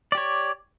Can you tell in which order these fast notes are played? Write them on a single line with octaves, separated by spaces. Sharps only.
D5 G4 C#5